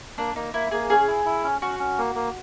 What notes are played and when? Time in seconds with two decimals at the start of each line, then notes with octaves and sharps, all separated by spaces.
0.18 A#3 D4
0.35 A#3 D#4
0.54 A#3 E4
0.71 A#3 G#4
0.90 C#4 G#4
1.08 E4
1.25 E4
1.44 C#4
1.61 C#4 F#4
1.80 C#4
1.98 A#3
2.15 A#3